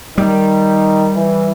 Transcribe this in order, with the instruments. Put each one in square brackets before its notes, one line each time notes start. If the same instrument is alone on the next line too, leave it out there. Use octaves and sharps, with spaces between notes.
[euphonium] D#3 [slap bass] G3
[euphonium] E3